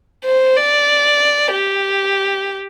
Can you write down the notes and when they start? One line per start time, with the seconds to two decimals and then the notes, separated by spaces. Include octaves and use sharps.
0.25 C5
0.57 D5
1.53 G4